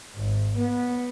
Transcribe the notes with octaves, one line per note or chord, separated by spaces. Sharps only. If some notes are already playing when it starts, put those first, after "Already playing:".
G#1
B3